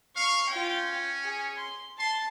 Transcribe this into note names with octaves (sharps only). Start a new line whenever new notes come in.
F5 C#6
C#4 F4 G5
G#4
C6
A5 C6